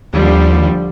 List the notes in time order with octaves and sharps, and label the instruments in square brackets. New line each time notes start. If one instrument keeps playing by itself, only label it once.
[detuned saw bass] D#2 [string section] D3 F3 G3